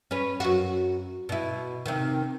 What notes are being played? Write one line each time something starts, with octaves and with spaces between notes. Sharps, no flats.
C#4 B4
F#2 F#4
B2 E4
C3 D#3